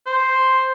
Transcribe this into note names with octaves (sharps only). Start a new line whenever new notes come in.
C5